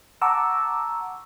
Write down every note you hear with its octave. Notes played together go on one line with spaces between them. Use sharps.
F#5 A5 A#5 C#6 D6 E6